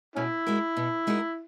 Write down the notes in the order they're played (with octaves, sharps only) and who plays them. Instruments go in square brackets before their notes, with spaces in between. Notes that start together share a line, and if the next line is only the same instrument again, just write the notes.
[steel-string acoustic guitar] B2 [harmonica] C#4 E4
[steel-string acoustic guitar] G#3 D#4 F#4 A#4
B2
G#3 D#4 F#4 A#4